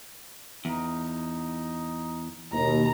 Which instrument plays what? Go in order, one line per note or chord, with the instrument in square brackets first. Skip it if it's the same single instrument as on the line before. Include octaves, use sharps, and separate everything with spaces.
[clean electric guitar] E2 [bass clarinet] D#4
[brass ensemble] D#2 D#4 [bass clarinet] B2 [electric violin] A#5